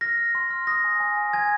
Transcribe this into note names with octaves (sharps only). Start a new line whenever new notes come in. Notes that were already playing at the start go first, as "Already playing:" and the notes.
F6 A#6
F6
C6
F6
D#6 A#6
G#5
G#5
G#5
G#5 G#6